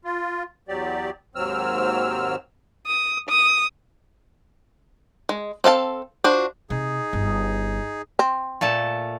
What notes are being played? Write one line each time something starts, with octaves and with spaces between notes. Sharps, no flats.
F4
E2 F#3 G4 D5
D#2 G#2 F#3 C4 E6 F6
D#6
D#6
G#3
C4 A4 F5 A5
D4 F4 F#4 C5
C3 D#4 G#4
G1
C4
A#2 A3 A5